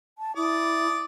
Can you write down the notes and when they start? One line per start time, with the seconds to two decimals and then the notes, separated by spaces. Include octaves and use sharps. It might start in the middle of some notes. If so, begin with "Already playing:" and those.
0.18 A5
0.36 E4 D5 D#6